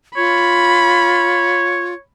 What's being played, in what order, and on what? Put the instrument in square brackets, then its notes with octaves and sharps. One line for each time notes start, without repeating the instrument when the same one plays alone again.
[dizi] F4 [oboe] C#5 [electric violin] B5